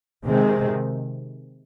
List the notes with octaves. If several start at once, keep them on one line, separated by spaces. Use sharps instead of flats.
C3 D#3 G#3 C4